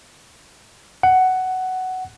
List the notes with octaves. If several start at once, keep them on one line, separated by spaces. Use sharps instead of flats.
F#5